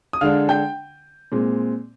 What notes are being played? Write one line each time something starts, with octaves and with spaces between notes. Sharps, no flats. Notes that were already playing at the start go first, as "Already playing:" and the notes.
D#6
D3 G#3 D4 F5 F6
G5 G6
A#2 G#3 C4